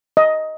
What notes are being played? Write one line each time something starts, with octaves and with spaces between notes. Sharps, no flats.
D#5